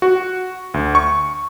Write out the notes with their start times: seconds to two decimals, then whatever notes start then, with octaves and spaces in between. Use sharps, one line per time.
0.02 F#4
0.74 D2
0.95 C#6